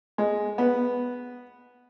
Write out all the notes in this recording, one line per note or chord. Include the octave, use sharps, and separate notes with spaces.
G#3
B3